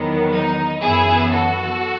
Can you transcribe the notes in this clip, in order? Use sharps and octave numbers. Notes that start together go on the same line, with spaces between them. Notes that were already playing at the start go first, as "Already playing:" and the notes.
Already playing: E2 D#3 F#3 B3
D#4
F#2 E3 B3 E4 G#4
F#4 A4